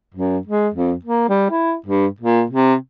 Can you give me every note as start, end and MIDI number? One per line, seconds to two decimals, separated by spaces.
0.14 0.38 42
0.47 0.69 56
0.74 0.93 41
1.05 1.27 58
1.29 1.47 55
1.51 1.75 64
1.86 2.07 43
2.20 2.44 46
2.50 2.75 48